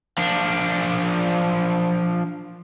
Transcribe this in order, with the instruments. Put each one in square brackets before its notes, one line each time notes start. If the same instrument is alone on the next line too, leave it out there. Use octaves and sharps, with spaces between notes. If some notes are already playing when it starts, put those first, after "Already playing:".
[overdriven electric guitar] F3 D4